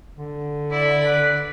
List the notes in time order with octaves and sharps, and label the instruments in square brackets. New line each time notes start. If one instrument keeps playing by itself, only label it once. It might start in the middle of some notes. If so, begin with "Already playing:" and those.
[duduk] D3
[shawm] E4 [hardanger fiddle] D5 B5
[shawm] B4